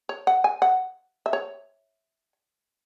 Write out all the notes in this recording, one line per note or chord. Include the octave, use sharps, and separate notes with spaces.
C#5
F#5
G#5
F#5
E5
C#5